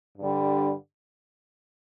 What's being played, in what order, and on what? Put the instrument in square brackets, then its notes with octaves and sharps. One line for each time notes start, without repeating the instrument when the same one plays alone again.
[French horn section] G2 D3 G3